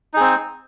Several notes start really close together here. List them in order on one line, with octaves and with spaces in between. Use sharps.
D#4 G#4 C4